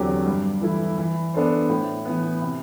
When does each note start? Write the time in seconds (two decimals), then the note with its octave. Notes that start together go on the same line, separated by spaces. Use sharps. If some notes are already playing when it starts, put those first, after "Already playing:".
Already playing: E2 D3 F#3 C4 G4
0.26 G2
0.61 E3 A3 E4
0.98 E3
1.34 B3 D4 A4 C5
1.69 A2
2.05 E3 B3
2.42 C3